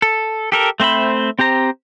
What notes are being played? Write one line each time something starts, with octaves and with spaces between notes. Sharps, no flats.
A4
G4 A4 A#4
A3 C4 C5 E5 B5
C4 G4 C5 A#5